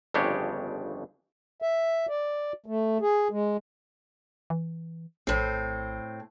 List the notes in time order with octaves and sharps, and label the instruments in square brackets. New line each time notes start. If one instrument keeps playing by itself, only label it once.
[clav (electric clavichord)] G1 F2 C#3 D4 G4 C#5
[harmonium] E5
D5
A3
G#4
G#3
[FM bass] E3
[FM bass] A#1 [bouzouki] A2 C4